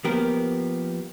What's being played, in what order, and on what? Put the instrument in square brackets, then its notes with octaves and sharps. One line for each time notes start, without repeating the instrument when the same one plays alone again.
[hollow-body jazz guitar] F3 A#3 B3 G4 A#4